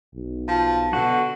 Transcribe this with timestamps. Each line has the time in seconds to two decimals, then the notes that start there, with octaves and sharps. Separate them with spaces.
0.15 B1
0.48 F3 A5
0.93 B2 D3 F#4